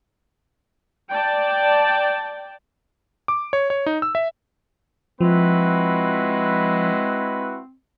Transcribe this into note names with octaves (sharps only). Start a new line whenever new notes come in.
D5 G5 A5
D6
C#5
C#5
D#4
E6
E5
F3 G#3 C4 E4 F#4 B4